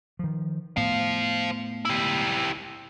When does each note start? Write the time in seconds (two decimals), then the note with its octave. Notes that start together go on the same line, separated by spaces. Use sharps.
0.19 D#3 F3
0.77 A2 B3 C5 F5
1.85 E4 G4